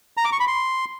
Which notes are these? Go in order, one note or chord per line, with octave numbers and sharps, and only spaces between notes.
A#5
D6
C#6
B5
C6